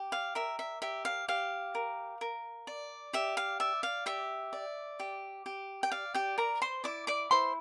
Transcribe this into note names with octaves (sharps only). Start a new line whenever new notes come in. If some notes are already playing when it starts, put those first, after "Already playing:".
Already playing: G4
F5
A#4 E5
E5
G4 E5
F5
G4 F5
A#4
A#4
D5
G4 E5
F5
D5 E5
F5
G4 E5
D5
G4
G4
G5
D5 F5
G4 G5
A#4 D5 A#5
C5 C6
E4 D5 D6
D5 D6
E4 C5 C6